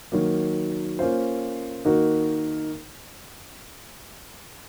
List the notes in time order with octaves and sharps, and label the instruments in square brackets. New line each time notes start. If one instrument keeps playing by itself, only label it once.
[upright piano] D#3 F#3 A#3
A#3 C#4 F4 C5
D#3 A#3 D#4 F#4 A#4